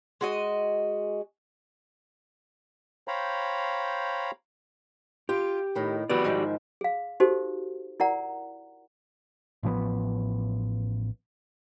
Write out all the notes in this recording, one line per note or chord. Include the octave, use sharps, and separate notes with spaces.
G#3 F#4 D#5
C5 C#5 F5 G5 A#5 B5
F4 G4
A2 D#3
B3 F#4 G4 D5
G#2 D#3 F3
G#4 F5
D#4 F#4 G4 A4 C5
E4 A#4 D5 F#5 A#5
A1 F3 A3 B3